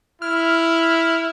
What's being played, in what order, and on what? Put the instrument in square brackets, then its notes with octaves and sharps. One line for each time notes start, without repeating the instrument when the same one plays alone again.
[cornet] E4 [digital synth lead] F6